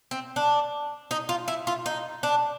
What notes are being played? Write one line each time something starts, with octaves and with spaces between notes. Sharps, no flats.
C4
D4
D#4
F4
E4
F4
D#4
D4